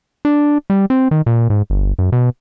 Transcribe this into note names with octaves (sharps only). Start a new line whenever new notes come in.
D4
G3
C4
D#3
A#2
G#2
G1
F#2
B2